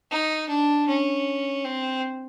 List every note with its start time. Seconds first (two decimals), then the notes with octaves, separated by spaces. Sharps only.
0.11 D#4
0.49 D4
0.88 C#4
1.65 C4